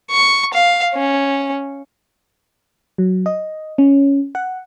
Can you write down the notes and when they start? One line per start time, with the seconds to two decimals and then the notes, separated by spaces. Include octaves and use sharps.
0.11 C#6
0.54 F5
0.95 C#4
2.98 F#3
3.26 D#5
3.78 C#4
4.35 F#5